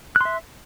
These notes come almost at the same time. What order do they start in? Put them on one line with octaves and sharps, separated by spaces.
F#6 C6 E5